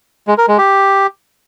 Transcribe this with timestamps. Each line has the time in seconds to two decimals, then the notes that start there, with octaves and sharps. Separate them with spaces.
0.27 G#3
0.38 A#4
0.48 G#3
0.58 G4